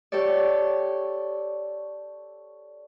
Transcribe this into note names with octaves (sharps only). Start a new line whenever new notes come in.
G4 A4 C#5 D5